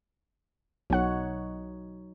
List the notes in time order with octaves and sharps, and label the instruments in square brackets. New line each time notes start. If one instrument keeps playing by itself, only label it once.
[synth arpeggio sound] B1 F#5 [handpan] F#3 D#4 C#5